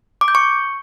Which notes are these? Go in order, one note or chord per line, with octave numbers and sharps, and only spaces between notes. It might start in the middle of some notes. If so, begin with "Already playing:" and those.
D6
G6
C#6